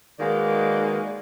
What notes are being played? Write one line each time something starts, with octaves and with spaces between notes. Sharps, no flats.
D#3 G#3 A#3 F#4 B4 D5